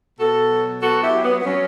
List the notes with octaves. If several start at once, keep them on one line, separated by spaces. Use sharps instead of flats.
B2 F#4 A4
F#3
B3 F#4 A4
E4 G4
F#3
B3
B3
F#3 C#4